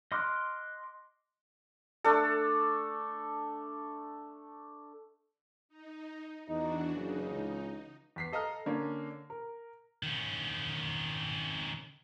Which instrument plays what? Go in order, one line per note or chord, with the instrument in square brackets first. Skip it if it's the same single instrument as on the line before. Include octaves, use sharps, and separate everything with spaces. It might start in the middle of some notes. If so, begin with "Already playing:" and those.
[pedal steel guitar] D#5 C6 D6 F6 F#6
[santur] A3 D4 A4
[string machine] D#4
[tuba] E2 [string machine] E3 D4 F#4 [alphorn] D#4
[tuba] F#1 [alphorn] C#3 [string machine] D#4
[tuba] C#2
[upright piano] E2 B6 C7
A4 D#5 F5 A#5 F6
D3 A#3 C#4 D4
A#4
[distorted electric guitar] D#3 C#4